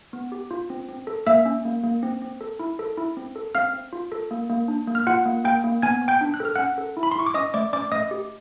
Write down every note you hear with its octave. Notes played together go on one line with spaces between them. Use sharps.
B3
G4
F4
C4
C4
A4
A#3 E5 E6
C#4
A#3
A#3
C4
C4
A4
E4
A4
E4
C4
A4
C4 F5 F6
C4
F4
A4
A#3
A#3
D4
A#3
F6
F4 F#5 F#6
A#3
A#3 G5 G6
A#3
B3 G#5 G#6
B3
G5 G6
D4
F#6
A4 F6
C#4 F#5 F#6
A4
E4
B5
C6
E4 C#6
D6
C#4 D#5 D#6
A3 D5 D6
C#4 D5 D6
A3 D#5 D#6
G4